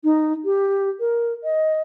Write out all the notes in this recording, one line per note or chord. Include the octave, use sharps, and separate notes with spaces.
D#4
G4
A#4
D#5